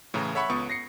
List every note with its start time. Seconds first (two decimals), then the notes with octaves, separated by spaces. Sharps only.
0.14 A2 C#3 E3 A#5
0.34 A4 C#5 E5 F#5 B5 C#6
0.50 C#2 B3 C#6 D#6
0.70 A#6 C7 C#7